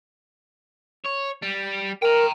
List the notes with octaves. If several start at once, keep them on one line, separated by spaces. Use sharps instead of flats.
C#5
G3
A#4 G5 A#5